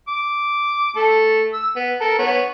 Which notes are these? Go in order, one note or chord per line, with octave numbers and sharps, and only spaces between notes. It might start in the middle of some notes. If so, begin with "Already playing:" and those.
D6
A3 A4
E6
B3
A4 A#4
B3 C#5